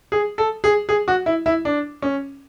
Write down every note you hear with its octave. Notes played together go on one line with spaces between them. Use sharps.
G#4
A4
G#4
G#4
F#4
E4
E4
D4
C#4